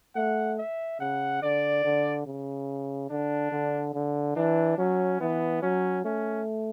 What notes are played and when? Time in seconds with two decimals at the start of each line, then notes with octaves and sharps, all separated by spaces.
0.15 A3 F#5
0.58 E5
1.00 C#3 F#5
1.42 D3 D5
1.84 D3
2.26 C#3
3.10 D3 D4
3.52 D3
3.94 D3
4.36 E3 D4
4.78 F#3 C#4
5.20 E3 B3
5.62 F#3 C#4
6.04 A3 C#4